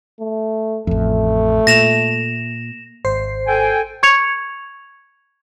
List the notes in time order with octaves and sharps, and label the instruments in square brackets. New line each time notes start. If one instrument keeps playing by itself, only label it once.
[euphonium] A3
[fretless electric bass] A1 F2 [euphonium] A3
[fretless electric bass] A#2 [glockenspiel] A#6 E7 F7
[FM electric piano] G#1 C5 C7
[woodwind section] A4 G5 G#5
[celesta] C#6 G#6 C#7 F7